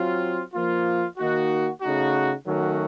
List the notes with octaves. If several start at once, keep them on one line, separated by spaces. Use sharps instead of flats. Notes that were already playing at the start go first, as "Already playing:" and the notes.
Already playing: F#3 C4 F4
F3 A#3 F4
D#3 A#3 D#4 F#4
C#3 A3 D#4 F#4
D#3 F#3 A3 C#4 F#4